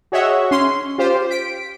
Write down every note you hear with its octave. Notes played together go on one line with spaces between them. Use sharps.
F#4 G#4 C#5 D#5 E5 F#5
C#4 C6
F4 G4 C5
B6 D7